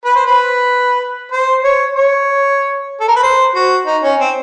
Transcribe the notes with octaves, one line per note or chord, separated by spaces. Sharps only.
B4
C5
B4
C5
C#5
C#5
A4
A#4
B4
C5
F#4
D#4
C#4
C4